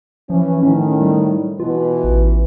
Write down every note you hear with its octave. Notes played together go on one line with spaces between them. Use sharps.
E3 F3 C#4
A2 D#3 C#4
G3
B2 E3 F4 B4
A1